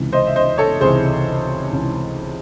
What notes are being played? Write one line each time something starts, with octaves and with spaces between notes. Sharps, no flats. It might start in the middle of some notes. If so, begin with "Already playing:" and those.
Already playing: C#2 C3 E3
C5 D#5
E5
C5 D#5
A4 C#5
C#2 C3 E3 G#4 C5
C#2 C3 E3